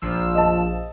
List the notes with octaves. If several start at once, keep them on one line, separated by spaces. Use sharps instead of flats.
A#1 F3 E6
D#5 A5